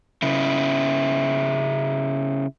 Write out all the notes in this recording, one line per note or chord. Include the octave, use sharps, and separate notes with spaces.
C#3 E4